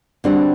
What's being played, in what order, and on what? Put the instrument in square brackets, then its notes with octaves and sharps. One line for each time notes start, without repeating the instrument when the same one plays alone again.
[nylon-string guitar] D3 G3 C4 F#4 [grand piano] D4